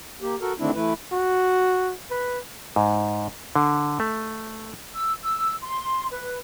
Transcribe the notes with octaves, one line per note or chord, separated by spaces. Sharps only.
A#3 G4
F#4 A4 A#4
D3 D#3 A3 C4 D4 E4
E3 A3 E4 B4
F#4
B4
G#2
D3
A3
E6
E6
C6
B4